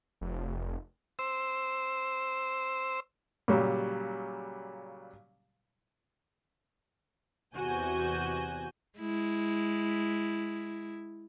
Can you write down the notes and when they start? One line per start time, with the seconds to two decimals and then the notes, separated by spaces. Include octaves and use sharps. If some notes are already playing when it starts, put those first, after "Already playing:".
0.21 F1
1.19 C5 E6
3.48 A#2 C#3 F#3 G3
7.54 E2 C3 F#4 G#5 G6
8.99 G#3 E4